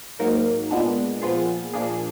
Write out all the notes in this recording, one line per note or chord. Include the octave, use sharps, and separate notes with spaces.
G#2 F#3 A#3 D#4 A#4
A#2 G#3 B3 D4
A#2 F3 B3 F4 G#4
A#2 F3 A#3 D4 G#4